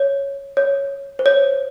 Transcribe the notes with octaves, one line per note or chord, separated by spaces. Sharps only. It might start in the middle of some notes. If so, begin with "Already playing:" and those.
Already playing: C#5
C#5
C5
C#5